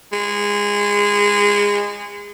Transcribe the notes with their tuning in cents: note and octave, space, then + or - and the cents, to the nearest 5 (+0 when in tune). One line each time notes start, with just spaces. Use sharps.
G#3 -20